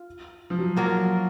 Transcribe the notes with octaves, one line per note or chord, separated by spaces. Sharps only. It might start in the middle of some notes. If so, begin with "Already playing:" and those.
Already playing: F4
F3
F#3
F#3 A#3 F4